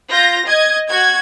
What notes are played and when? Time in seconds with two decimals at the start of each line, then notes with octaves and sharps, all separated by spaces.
0.10 F4 G6 A#6
0.46 D#5 G#6
0.89 F#4 G#6